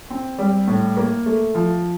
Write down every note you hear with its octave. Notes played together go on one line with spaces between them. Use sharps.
C4
G3
A2
A#3
A3
F3